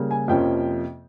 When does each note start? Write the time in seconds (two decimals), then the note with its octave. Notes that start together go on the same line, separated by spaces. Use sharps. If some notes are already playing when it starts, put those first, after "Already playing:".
Already playing: C#3 G3 A#3 C#4
0.11 G#5
0.28 F2 C3 F3 A#3 C#4 G5